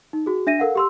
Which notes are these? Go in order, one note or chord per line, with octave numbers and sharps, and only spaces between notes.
D#4
F#4 G#4
D4 E5 A#6 D#7
A4 A#4 F5 F#5
G4 C6 E6